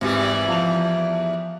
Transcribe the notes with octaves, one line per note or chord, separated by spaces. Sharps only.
G#1 E2 E3 G3 G4
F3 A5 F7